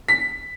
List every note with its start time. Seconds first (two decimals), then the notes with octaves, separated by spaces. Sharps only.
0.08 B6